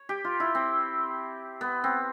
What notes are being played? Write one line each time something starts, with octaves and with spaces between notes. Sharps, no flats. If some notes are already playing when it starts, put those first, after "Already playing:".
Already playing: C#5
G4
F4
E4
C4
B3
C4